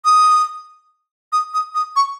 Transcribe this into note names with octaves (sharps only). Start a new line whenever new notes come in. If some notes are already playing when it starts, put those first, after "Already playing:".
D#6
D#6
D#6
D#6
C#6